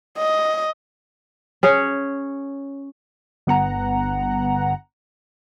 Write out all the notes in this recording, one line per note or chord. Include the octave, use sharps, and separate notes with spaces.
D#5
C#4 G#4 C#5
G1 B3 F#5 A#5